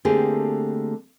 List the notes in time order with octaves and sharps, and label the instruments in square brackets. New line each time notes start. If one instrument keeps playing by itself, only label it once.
[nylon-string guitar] D3 A3 A#3 C4 G4 G#4